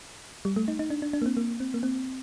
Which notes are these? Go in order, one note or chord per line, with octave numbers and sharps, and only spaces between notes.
G3
A3
D#4
D#4
D4
D4
D4
A#3
C4
A#3
C4
A#3
C4